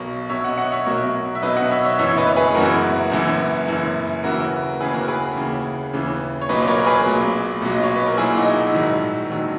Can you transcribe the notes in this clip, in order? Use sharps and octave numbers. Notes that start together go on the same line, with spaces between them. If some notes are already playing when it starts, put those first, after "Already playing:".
Already playing: B1 B2 F#3 A#4 C#5
B1 B2 F#3 C#5 E5
D#5 F#5
D#5 F#5
C#5 E5
B1 B2 F#3 A#4 C#5
E5
B1 B2 F#3 B4 D#5
D#5 F#5
C#5 E5
C#5 E5
F#1 F#2 E3 C#5 E5
B4 D#5
C#5
G#4 B4
F#1 F#2 E3 F#4 A#4
F#1 F#2 E3
F#1 F#2 E3
D#2 C#3 E3 F#4 A#4
D#2 C#3 E3 G#4 B4
F#4 A#4
G#4 B4
D#2 C#3 E3
D#2 C#3 E3
C#5
B1 A#2 F#3 B4 D#5
B4
A#4 C#5
A#4
G#4 B4
B1 A#2 F#3
B1 A#2 F#3
D#5
C#5
B4
A#4
B1 A#2 F#3 E4 G#4
D#4 F#4
E4
A#1 G#2 D#3 F#3
A#1 G#2 D#3 F#3